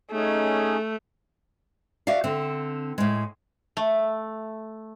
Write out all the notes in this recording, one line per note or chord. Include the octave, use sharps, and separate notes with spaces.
A3 C#4 D#4 G#4
F#4 D5 E5 F5
D3 C4
A2 G#3
A3